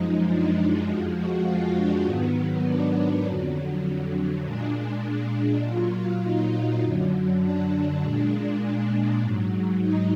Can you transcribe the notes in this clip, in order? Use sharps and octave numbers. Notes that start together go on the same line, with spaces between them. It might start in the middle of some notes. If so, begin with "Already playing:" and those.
Already playing: F#2 F3 G#3 D#4
D4
F2 F3 G#3 F#4
F#4
F4
D4
G#2 D#3 F#3 B3
D4
F2 D3 F#3
A#2 G#3 D4
D4
A#2 F#3 F4
D#4
F#2 D3 F#3
D4
A#2 G#3
G#2 F#3
D#4